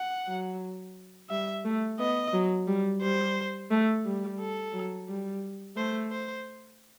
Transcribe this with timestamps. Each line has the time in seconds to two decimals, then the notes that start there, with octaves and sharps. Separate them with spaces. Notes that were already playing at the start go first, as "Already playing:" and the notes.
Already playing: F#5
0.28 F#3
1.30 G3 E5
1.65 A3
1.99 B3 D#5
2.33 F#3
2.67 G3
3.02 G3 C5
3.71 A3
4.05 G3
4.40 A4
4.73 F#3
5.09 G3
5.76 A3 C5
6.12 C5